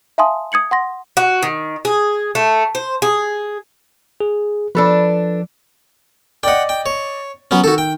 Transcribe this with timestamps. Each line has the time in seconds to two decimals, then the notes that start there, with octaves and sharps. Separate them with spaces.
0.18 E5 F5 G#5 A5 C6 D#6
0.52 D#6 G#6 C#7 F#7
0.71 F#5 C6 A#6
1.17 F#4
1.43 D#3
1.85 G#4
2.35 A3
2.75 C5
3.02 G#4
4.20 G#4
4.75 F3 D4 A4 B4
6.43 D5 D#5 F#5 G5
6.69 G5
6.86 C#5
7.51 F#3 B3 C#4
7.64 D#3 F#4 A4
7.78 G5